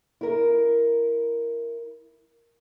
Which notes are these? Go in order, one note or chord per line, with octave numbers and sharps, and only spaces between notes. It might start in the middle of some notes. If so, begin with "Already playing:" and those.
E4 A#4